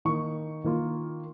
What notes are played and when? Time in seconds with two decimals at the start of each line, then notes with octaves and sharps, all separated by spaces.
0.05 D#3 A#3 D#4 C#6
0.64 D#3 A#3 F4